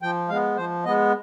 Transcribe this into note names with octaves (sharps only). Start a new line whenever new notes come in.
F3 G5
G#3 B3 F5
F3 C5
G#3 B3 D#5